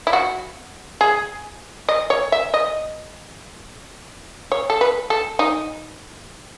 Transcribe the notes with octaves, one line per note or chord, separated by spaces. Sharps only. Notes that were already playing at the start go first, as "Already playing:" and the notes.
E4
F#4
G#4
D#5
C#5
E5
D#5
C#5
A4
B4
A4
D#4